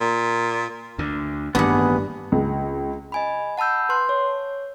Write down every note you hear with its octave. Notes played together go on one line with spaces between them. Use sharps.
A#2
D2 D3
A1 G2 D#3 A#3 B3 G#4 F#5
C#2
D#5 G#5 B5
F#5 A5 B5 E6 G6
B4 C6 F#6
C#5